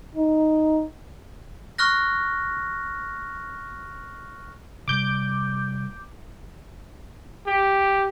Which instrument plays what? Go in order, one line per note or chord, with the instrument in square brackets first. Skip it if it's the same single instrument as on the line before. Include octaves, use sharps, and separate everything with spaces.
[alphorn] D#4
[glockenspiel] C#6 F6 F#6 A#6
[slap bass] C3 G3 [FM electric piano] D6 G6
[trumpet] G4